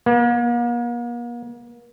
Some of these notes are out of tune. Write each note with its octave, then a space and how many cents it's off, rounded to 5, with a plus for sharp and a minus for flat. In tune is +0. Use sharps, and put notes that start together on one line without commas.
A#3 +40